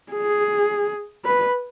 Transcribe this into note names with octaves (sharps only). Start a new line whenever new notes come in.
G#4
B4